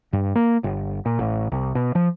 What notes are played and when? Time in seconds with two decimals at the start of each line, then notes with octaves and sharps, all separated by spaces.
0.13 G2
0.35 A#3
0.64 G1
1.06 A#2
1.19 A1
1.52 C2
1.75 B2
1.95 F3